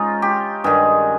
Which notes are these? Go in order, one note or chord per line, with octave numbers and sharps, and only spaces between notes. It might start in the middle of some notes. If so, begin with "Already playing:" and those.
Already playing: G#2 C#4 D#4 F4
G4
G2 D#3 G#4